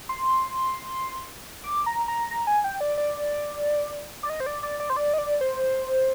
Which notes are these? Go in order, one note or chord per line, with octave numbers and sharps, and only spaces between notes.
C6
D6
A#5
A#5
A#5
G#5
G5
D5
D5
D5
D#5
C5
D5
D5
D5
C5
D5
D#5
D5
C5